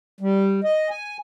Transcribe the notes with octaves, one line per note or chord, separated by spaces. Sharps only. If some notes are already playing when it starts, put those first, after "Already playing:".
G3
D#5
G#5